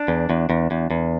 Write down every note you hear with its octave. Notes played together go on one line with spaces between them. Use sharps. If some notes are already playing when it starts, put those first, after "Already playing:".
Already playing: D4
E2
E2
E2
E2
E2